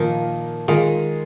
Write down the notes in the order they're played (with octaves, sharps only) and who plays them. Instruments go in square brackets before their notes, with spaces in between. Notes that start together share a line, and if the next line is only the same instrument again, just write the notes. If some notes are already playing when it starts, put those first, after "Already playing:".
Already playing: [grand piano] A#2 F3 A#3 [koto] D#3
[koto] D#3 [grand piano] G#3 F4 G#4